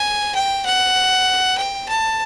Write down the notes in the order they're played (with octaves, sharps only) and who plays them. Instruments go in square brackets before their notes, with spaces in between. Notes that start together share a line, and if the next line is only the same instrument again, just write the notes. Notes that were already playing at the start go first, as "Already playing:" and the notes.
Already playing: [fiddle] G#5
G5
F#5
G5
A5